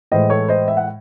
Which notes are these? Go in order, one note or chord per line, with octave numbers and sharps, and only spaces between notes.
A2 E3 G#3 C5 D#5
A4 C#5
C5 D#5
E5
F#5